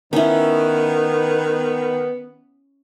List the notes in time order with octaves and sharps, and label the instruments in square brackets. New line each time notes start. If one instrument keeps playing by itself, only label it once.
[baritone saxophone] D#3 [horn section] B3 [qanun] C#4 E4